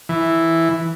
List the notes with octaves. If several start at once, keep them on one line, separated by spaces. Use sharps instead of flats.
E3